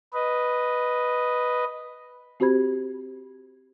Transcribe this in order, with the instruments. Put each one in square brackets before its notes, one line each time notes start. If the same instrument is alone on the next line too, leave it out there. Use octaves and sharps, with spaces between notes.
[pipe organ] B4 D#5
[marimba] C4 F#4 G4 C5 B5 G#6